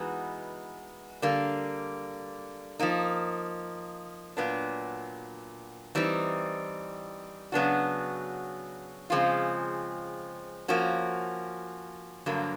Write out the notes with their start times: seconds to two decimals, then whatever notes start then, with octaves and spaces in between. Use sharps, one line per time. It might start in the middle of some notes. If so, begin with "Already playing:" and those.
Already playing: E3 G#3 B3 D#4 F#4
1.22 D3 G3 A#3
2.79 F3 A#3 D#4
4.37 A#2 F#3 B3 D4
5.95 E3 G3 C4 D#4
7.52 C#3 F#3 B3 D4 F#4
9.10 C#3 F3 G#3 C4 F4
10.68 F3 A#3 C#4 F#4
12.26 G2 D3 F#3 A#3